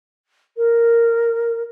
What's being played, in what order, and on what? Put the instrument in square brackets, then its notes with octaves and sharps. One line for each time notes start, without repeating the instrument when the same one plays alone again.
[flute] A#4